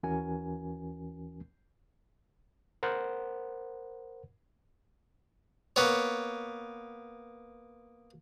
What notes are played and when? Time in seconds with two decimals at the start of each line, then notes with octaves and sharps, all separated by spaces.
0.03 D#2 E3 C#4 F#4 A#4 G#5
2.83 A#4 C5 F#5
5.76 A#3 B3 C#5